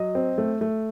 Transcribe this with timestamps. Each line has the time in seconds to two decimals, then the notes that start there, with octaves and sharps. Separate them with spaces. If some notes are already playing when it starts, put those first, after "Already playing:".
Already playing: F#3 D#5
0.15 C4
0.38 A3
0.61 A3